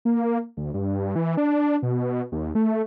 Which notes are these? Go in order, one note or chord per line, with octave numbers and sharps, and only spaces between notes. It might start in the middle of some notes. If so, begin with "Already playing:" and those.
A#3
D2
G2
E3
D4
B2
D#2
A3